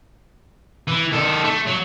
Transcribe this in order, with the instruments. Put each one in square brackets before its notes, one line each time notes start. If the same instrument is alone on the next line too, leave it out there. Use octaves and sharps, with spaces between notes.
[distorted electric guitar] E3
D#3 A4
A3
F#3